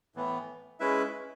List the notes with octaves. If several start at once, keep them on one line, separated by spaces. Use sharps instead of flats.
A2 E3 B3
G#3 C#4 E4 B4 E5